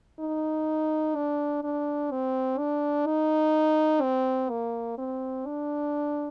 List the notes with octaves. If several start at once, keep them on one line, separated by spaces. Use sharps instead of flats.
D#4
D4
D4
C4
D4
D#4
C4
A#3
C4
D4